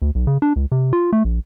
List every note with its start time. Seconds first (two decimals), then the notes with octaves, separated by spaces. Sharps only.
0.02 D2
0.15 B1
0.27 C#3
0.42 D4
0.56 C#2
0.72 C3
0.93 F4
1.13 A3
1.25 A#1